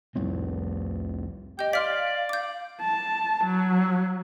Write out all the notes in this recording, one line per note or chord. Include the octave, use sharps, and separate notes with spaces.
C2 F2 G3 C4
G4 D#5 G6
D5 F5 C6 F6 B6
D6 G6
A5
F#3